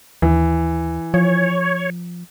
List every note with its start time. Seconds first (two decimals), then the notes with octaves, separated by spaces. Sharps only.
0.22 D#2 E3
1.14 F3 C#5